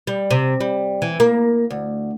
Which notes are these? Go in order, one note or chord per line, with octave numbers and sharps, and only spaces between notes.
G3
C3
G3
E3
A#3
D2